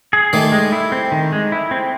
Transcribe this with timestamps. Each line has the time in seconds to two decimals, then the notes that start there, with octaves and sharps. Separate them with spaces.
0.13 G#4
0.33 D#3 G3 A3
0.52 G#3
0.72 E4
0.92 C4
1.12 D#3
1.32 G#3
1.52 E4
1.71 C4